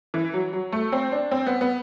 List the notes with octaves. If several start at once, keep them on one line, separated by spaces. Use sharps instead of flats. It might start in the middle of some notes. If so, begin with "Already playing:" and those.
E3
F#3
F#3
A3
C4
D4
C4
B3
B3